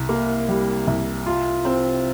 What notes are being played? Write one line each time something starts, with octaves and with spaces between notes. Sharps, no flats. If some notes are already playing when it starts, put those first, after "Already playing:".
Already playing: C2
A#3
G3
C2
F4
C4